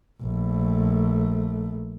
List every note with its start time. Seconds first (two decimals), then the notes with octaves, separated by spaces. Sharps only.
0.22 A#1 A3